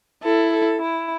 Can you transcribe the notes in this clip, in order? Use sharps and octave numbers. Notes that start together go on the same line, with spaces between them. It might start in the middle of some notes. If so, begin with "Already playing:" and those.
E4 A4
A4
E4